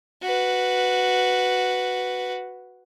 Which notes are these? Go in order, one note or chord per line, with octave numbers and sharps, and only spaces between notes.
F#4 B4